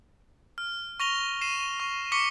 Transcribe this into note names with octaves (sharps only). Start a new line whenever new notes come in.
F6
C#6 A#6 F7 G7
C7 D#7 E7
C#6
C#6 D6 B6 C#7 G7